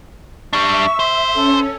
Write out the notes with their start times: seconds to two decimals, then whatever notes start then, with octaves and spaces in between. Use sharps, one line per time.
0.53 G3 D4 E5 C#6
0.99 C5
1.34 C#4 A4